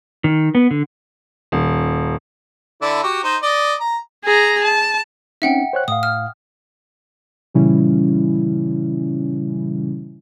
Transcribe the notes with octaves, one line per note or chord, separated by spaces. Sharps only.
D#3
B3
D3
D#1
D3 E4 D5
F#4 G4 C#6
D#4 C5
D5 D#5
A#5
G#4 A#5
A5
C4 C#4 D#4 E5 F#5 G5
C5 C#5 F#6
A2 F5 D#6
F6
A#2 C#3 E3 G3 C#4 E4